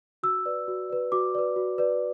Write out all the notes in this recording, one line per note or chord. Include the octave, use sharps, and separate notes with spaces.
F#4 E6
B4 D5
F#4
B4 D5
F#4 D6
B4 D5
F#4
B4 D5